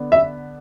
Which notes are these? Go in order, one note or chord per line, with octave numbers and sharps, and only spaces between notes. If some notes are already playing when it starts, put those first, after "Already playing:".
Already playing: D3 B3 D4
E5